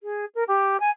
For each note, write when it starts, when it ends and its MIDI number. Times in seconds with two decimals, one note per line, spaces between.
0.02 0.25 68
0.35 0.43 70
0.47 0.77 67
0.80 0.90 80